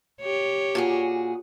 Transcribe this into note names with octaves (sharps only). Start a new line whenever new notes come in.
G4 C#5
A#2 F#4 G#4